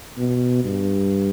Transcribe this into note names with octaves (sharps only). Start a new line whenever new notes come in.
B2
G2